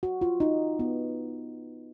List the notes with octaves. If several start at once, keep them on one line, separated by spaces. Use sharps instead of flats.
F#4
F4
D#4
B3